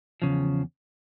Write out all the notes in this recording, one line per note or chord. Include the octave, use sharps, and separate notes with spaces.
E2 C#3 F3